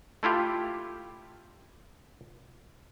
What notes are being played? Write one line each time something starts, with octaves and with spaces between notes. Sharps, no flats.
A3 E4 F4 G4